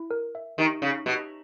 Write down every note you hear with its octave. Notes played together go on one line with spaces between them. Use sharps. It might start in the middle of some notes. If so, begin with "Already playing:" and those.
Already playing: E4
A#4
E5
D#3 G4
C#3 C#4
B2 G4